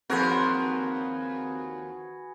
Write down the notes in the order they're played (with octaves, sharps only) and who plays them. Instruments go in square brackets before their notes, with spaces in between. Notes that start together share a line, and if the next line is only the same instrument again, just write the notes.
[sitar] D#2 F3 A#4 [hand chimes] C4 [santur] F#4 G#4 B4